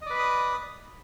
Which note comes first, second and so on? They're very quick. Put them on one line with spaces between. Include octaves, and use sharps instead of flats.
D#5 D5 B4 B5 D#6